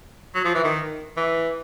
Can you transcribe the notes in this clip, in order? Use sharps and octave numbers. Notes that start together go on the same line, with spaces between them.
F#3
F3
E3
D#3
E3